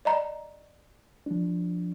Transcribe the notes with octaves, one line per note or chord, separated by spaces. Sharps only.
D5 D#5 A#5
F3 D4